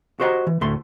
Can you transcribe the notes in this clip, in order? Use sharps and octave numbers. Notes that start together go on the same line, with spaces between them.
F#4 G4 C5 D#5 F#5 A#5
E3
D2 A2 A3 C6